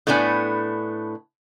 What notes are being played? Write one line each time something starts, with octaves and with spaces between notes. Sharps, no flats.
A2 A3 B3 D4 G#5